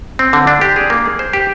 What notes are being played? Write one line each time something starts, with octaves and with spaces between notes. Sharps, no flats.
C4
D3
D4
G4
G#4
A#3
G#4
C5
G4